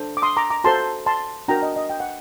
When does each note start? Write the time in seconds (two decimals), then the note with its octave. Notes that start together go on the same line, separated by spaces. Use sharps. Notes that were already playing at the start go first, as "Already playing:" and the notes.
Already playing: D4 A4 C5
0.17 D6
0.22 C6 D#6
0.37 A#5 D6
0.50 A#5 D6
0.64 F#4 A4 C5 A5 C6
1.06 A5 C6
1.48 D4 F#4 A#4 G5 A#5
1.62 D#5
1.76 D#5
1.90 G5
2.00 F#5